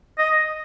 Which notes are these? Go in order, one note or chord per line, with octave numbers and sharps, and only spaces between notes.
D#5